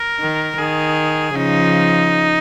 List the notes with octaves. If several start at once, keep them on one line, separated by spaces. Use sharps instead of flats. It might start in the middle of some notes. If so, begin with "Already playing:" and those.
Already playing: A#4
D#3
D#3 G#4
C#3 F3 D#4